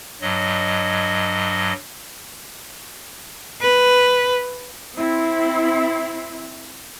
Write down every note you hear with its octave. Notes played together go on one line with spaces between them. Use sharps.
G2 F#3 D#5
B4
C4 E4